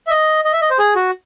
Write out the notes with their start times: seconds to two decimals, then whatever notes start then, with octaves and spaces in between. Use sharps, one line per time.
0.07 E5
0.10 D#5
0.44 D#5
0.53 E5
0.61 D#5
0.70 C5
0.79 G#4
0.96 F#4